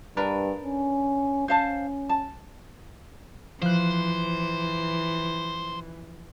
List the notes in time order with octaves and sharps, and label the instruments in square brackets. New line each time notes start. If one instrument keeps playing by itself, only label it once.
[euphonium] G2 [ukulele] D4 A#4 B4
[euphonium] C#4
[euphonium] C#4 [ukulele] C5 F5 A5
[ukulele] A5
[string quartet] E3 [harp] F3 F#6 [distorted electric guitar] C5